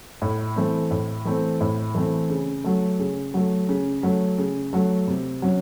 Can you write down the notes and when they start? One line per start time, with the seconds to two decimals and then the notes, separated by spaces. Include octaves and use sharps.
0.22 A2
0.56 E3 A3 C4
0.91 A2
1.25 E3 A3 C4
1.61 A2
1.95 E3 A3 C4
2.30 C#3
2.64 F#3 A3
2.99 C#3
3.34 F#3 A3
3.69 C#3
4.03 F#3 A3
4.38 C#3
4.73 F#3 A3
5.07 C3
5.42 F#3 C#4